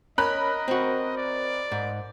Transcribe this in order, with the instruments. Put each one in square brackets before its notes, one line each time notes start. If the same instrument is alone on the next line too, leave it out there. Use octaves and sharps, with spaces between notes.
[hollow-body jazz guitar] C#4 [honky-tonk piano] A#4 B5 F#6 [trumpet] D#5
[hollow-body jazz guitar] C4 F#4
[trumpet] D5
[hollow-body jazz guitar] G#2